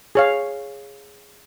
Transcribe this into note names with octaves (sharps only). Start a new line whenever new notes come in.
G#4 C#5 F5